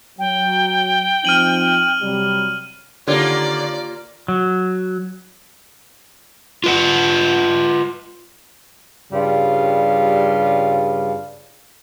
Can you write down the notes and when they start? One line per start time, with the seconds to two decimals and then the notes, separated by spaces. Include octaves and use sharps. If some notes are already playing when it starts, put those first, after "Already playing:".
0.19 F#3 G5
1.25 F3 C4 D#4 F6 D#7 F#7
2.01 C3 F#3 G3
3.07 D3 D#3 A#3 F4 G4 C#5 D5
4.28 F#3
6.64 F4 B4 F#5
9.12 G2 C#3 G3 F4